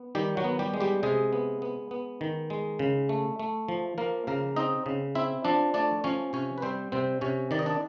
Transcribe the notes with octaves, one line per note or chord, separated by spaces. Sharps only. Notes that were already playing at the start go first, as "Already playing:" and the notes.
Already playing: B3
D#3 G3 G4
F#3 F#4
B3
G3 G4
G#3
G3 G4
C3 G#3 G#4
B3
B3
B3
D#3
G#3
C#3
A3
A3
F3
F3 A#3 A#4
C#3 A#3 A#4
C4 D#4 D#5
C#3
C4 E4 E5
F3 D4 D5
A3 D4 D5
F3 C#4 C#5
C3 C#4 C#5
B4
G3 C4 C5
C3 C4 C5
C3 C#4 C#5
D#3 D5
D#5
D4 D5